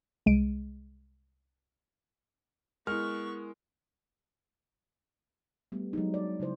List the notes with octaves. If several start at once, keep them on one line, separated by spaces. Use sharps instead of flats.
C2 G#3 D7 D#7
G#3 B3 E4 A#4 C#6 F6
G3 A3 B3
F#3 G#3 D#4
D5
C#3 F#3 E4 C5